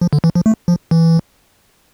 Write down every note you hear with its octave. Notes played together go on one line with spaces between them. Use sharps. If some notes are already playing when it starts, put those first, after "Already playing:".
F3
D3
E3
F3
A3
F3
E3